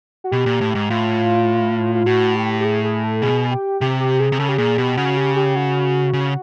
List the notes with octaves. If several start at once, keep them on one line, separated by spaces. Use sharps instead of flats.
F#4
B2 G4
A#2
A2
G#2
A2 F4
F4
A2 F#4
G4
G4
G#4
G#4
A4
B2 G#4
G4
C3 G4
G4
G#4
C3
C#3 A4
G4
A#2 G#4
B2 G4
C#3 F#4
G4
G4
F#4
C#3